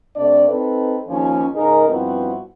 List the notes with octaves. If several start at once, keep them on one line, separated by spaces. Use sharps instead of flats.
C3 A3 D4 D5
C4 D#4 A4 B4
D#2 F3 C#4
G#2 C#3 D#4 G#4 A#4
G2 F3 B3 C4 E4 F#4